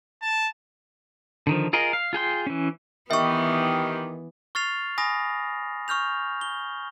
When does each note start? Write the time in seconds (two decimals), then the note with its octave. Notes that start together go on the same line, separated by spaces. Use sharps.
0.22 A5
1.47 D3 D#3 F3
1.73 F4 G#4 A#4 D#5
1.93 F5
2.13 F4 G#4 G5 C6
2.47 E3 C#4
3.11 D#3 E3 B3 G4 E5 C#6
4.55 C#6 F6 A6 C7 F7
4.98 G#5 B5 D#6 A#6
5.88 C#6 F6 G6 F7
6.41 G7